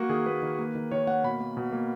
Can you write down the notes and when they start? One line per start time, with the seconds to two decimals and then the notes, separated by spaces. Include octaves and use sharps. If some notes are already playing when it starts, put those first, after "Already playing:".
Already playing: A#3 F#4
0.09 D#3 G#4
0.26 A#3 B4
0.42 D#3
0.59 A#3
0.75 D#3
0.91 D#3 C#5
1.07 A#3 F#5
1.24 B2 B5
1.40 A#3
1.57 B2
1.72 A#3